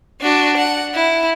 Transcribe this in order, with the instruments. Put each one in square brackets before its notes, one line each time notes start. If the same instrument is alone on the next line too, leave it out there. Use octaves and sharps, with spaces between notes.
[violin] D4 F#4
F#5
E4